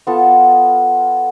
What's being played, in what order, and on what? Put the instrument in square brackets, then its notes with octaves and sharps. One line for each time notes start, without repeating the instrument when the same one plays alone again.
[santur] B3 F4 A4